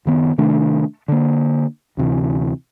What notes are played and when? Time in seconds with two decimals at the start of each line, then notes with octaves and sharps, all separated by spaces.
0.05 F#1 D#3 B3
0.38 C3 D#3 A3 D4
1.08 D3 A#3
1.97 D2 C3 E3